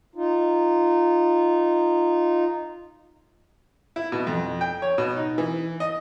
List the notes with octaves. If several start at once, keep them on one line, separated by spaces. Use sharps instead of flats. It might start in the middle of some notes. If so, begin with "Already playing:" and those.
D#4 F4
E4
B2
F2
G5
C#5
B2
D#4
E3
D#5